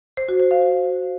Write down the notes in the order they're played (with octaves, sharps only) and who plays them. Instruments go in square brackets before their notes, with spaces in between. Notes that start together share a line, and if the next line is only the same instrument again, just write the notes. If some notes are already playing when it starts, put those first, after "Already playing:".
[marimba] C5
F#4
C5
F5